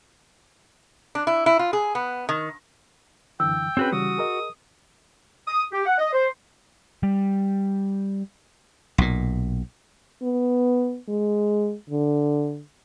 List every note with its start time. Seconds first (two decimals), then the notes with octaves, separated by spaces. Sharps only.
1.15 D4
1.27 E4
1.46 E4
1.59 F4
1.73 G#4
1.95 B3
2.29 D#3
3.40 F#2 D3 E3 G5 E6
3.77 C4 C#4 F#4 G#4 B4
3.92 C#3 E3 G3 F#4 D#6
4.18 G#4 A#4 D#5
5.47 D#6
5.72 G4
5.86 F#5
5.98 D#5
6.13 C5
7.03 G3
8.98 B1 A#2
10.23 B3
11.09 G#3
11.90 D3